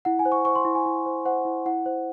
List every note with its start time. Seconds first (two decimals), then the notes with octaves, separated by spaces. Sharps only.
0.05 E4 F#5
0.19 G#5
0.25 C5
0.32 C#6
0.45 C5 C#6
0.55 C6
0.65 E4
0.75 G#5
0.86 E4
1.06 C5
1.25 C5 F#5
1.45 E4
1.66 E4 F#5
1.86 C5